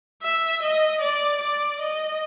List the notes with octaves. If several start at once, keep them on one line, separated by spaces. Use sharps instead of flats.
E5
D#5
D5
D5
D#5